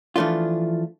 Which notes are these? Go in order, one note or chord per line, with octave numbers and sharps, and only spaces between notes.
E3 F3 A3 D4 F4